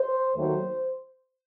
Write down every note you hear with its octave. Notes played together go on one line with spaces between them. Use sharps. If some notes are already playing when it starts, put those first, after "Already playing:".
Already playing: C5
D#2 D#3 F#3 A3 C5